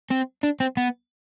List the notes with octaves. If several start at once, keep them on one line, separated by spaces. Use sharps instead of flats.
C4
D4
C4
B3